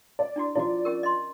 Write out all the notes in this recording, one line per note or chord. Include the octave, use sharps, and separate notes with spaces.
D5
D4 E4 F#4
F3 E4 F#4 D5
C#4 G4 A#4
D#5 C6